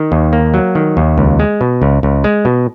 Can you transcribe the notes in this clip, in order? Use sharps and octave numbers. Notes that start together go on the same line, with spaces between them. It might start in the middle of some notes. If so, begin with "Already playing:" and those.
Already playing: D#3
D#2
A#3
F#3
D#3
D#2
C#2
G#3
B2
C#2
C#2
G#3
B2